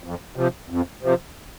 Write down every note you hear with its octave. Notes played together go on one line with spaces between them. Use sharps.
F2
C3 F3
F2
C3 F3